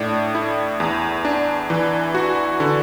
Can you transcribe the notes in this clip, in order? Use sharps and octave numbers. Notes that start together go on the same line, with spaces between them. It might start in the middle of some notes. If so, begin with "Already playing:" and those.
Already playing: A2 D4
E4
E2
D4
E3
F#4
D3